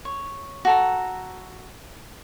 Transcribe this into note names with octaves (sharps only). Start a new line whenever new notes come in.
C#5
F#4 A4 A#5